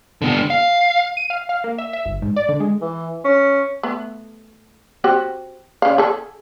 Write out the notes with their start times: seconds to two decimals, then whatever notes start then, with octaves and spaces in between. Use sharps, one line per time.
0.22 D3 B3
0.50 F5
1.17 D#7
1.30 F5
1.49 F5
1.64 A#3
1.78 E5
1.93 E5
2.05 G1
2.22 G#2
2.36 D5
2.49 D3
2.60 G#3
2.81 E3
3.25 C#4
3.83 A3 B3
5.04 C4 F#4 G4
5.82 C#3 F5
5.98 G#4 A4